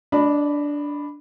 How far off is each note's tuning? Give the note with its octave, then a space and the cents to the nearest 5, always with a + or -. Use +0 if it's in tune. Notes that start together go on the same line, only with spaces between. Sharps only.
D4 -10 D#5 -35 B5 +0